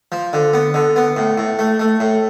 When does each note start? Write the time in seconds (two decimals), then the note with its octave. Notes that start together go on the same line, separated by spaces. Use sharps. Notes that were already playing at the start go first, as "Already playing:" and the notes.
0.12 F3
0.33 D3
0.53 B3
0.74 D3
0.96 B3
1.17 A2
1.38 A2
1.59 A3
1.79 A3
2.00 A2